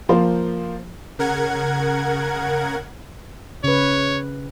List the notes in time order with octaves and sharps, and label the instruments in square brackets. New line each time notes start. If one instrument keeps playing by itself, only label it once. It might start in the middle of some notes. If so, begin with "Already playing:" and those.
[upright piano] F3 A#3 F4 C5
[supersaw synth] C#3 A#4 F#5 G#6
[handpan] C#3 B4 [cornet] C#5